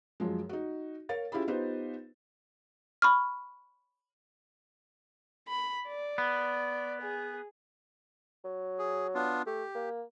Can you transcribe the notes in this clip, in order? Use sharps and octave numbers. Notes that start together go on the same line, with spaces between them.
F#2 F3 G#3
D#4 F#4
A#4 C#5 F5 A6
C#4 E4 F4 G4 G#4 B5
B3 D#4 F4 G4 B4 C5
B5 C#6 F6
B5
D5
B3
G#4
F#3
G#4
B3 D4 F4
A3 G4
A#3